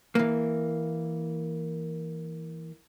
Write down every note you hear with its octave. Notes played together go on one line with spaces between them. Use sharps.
E3 A#3